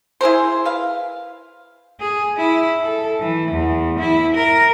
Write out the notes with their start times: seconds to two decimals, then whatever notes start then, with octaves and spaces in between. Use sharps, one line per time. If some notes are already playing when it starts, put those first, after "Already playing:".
0.21 E4 G#4 A#4 C5
0.65 B4 F5
2.00 G#4
2.37 E4
2.82 A4
3.21 E3
3.52 E2
4.00 E4
4.35 A#4